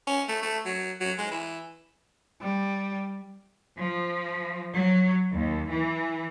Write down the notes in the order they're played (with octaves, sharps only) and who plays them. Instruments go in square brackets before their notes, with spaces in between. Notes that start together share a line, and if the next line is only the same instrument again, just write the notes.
[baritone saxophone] C#4
A3
A3
F#3
F#3
G#3
E3
[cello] G3
[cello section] F3
F#3
D#2
E3